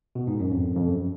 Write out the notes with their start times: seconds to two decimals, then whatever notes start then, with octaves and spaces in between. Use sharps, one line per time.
0.15 B2
0.27 G#2
0.40 F#2
0.52 F2
0.76 F2
0.89 F#2